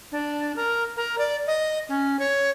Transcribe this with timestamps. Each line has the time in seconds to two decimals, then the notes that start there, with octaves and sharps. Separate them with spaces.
0.12 D4
0.56 A#4
0.97 A#4
1.18 D5
1.47 D#5
1.89 C#4
2.19 C#5